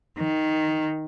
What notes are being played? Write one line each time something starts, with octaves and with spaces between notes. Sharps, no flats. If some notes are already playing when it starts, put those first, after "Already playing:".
D#3